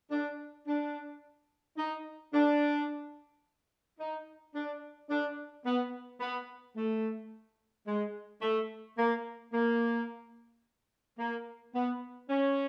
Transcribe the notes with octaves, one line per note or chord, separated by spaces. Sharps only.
D4
D4
D#4
D4
D#4
D4
D4
B3
B3
A3
G#3
A3
A#3
A#3
A#3
B3
C#4